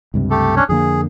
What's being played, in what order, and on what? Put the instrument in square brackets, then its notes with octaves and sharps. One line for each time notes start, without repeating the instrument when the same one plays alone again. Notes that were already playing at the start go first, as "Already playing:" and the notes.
[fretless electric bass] C#2 G2 C3
[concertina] A3 G4 A4
C#4 D4 C#5
[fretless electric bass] F2 D3 A#3 [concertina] G#4